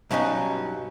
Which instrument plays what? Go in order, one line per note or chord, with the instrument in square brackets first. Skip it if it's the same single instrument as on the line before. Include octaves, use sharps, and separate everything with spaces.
[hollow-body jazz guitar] G2 B2 F#3 C#4 D#4